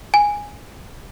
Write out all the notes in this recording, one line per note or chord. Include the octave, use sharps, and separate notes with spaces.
G#5